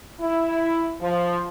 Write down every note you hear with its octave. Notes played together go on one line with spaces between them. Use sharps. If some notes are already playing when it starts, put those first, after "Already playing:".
E4
F3